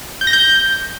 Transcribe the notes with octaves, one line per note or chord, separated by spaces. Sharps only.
G6
A#6
G6